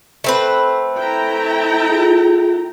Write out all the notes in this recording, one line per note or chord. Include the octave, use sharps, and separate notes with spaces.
A3 C4 B4
E4 G5 A#5
F4 G#4